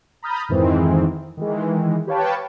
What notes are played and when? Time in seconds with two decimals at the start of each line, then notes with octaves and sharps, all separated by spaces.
0.22 A#5 B5 D#6 F6 G6 A6
0.49 F2 G#2 D#3 E3 G#3 C4
1.37 D#3 E3 G#3
2.07 G4 B4 C#5 F5 G5 A5